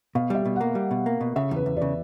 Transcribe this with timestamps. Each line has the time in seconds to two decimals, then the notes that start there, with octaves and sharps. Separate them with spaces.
0.15 B2 F5
0.30 G3 E5
0.45 B2
0.56 A#3 F#5
0.75 G3
0.91 B2
1.06 A#3
1.21 B2
1.36 C#3 E5
1.51 E2
1.56 B4
1.66 E2
1.77 D5
1.82 C#3